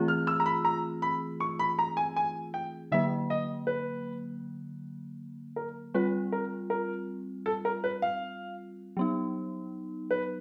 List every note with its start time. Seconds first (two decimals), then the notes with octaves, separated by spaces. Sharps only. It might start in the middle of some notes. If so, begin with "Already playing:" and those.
Already playing: E3 A3 C4 F4 G#4
0.08 F6
0.27 E6
0.40 A#5
0.46 B5
0.65 A#5
1.02 B5
1.40 C#6
1.59 B5
1.79 A#5
1.97 G#5
2.16 G#5
2.54 G5
2.92 D3 F#3 A#3 E5
3.30 D#5
3.67 B4
5.56 A#4
5.94 G3 C4 F4 B4
6.32 A#4
6.70 A#4
7.46 A4
7.65 A#4
7.84 B4
8.02 F5
8.97 F#3 B3 D#4
10.11 B4